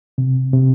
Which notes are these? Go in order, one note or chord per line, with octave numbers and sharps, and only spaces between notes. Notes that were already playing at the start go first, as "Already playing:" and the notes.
C3
C3